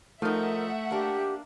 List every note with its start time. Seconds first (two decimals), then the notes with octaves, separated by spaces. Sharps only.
0.22 F3 A3 D#4 A#4 E5 F#5
0.91 A#3 D4 G4